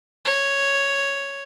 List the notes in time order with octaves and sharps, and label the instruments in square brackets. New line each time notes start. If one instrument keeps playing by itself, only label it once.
[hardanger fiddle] C#5